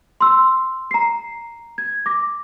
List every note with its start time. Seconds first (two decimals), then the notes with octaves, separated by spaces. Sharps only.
0.21 C6 E6
0.91 A#5 C7
1.78 G#6
2.06 D6 A#6